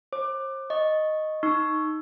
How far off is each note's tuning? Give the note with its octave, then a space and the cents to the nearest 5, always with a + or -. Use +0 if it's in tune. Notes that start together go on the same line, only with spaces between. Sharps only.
C5 +40 D6 +15
D#5 +0 C#6 -10
D#4 +0 C#6 +0 E6 +15